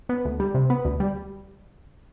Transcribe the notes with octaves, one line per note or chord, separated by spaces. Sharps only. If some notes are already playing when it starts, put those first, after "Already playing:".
B3
D2
G3
C3
B3
D2
G3